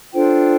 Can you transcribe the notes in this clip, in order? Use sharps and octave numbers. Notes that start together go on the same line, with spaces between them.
D4 F4 A4 C5 G5